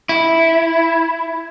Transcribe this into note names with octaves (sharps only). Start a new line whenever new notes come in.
E4